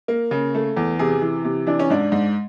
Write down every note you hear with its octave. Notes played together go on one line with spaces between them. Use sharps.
A#3
C#3
A3
E2
C3 G#4
E3
C3
E3 D4
C#4
G#2 D4
G#2